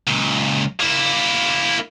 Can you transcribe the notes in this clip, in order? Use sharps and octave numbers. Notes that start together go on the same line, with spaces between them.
C#2 A#2
A#3 E4